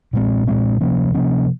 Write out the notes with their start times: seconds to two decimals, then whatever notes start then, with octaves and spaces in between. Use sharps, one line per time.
0.13 A#2 G#3 C4
0.47 A#2 G#3 C4
0.81 C3 F3 A#3 C#4
1.14 C3 F3 A#3 C#4